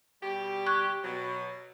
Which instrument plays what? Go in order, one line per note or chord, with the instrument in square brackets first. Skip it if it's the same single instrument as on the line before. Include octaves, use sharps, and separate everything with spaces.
[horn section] B2 G3 G4
[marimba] C#6 F#6 G#6
[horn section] B2 F#3